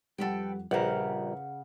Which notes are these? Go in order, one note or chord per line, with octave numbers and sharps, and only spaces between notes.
B1 F2 G3 A4 B4 F#5 G5
A#1 C#3 G3 B4 F#5 G5 A#5